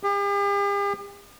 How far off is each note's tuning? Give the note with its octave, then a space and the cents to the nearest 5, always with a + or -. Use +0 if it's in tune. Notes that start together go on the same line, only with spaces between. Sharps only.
G4 +45